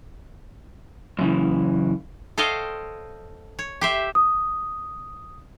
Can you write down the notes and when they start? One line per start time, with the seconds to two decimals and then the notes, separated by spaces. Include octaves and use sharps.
1.19 F#2 C#3 E3
2.38 A4 C5 C#5 D#5 F5 G5
3.59 C#5
3.81 G4 C5 E5
4.15 D#6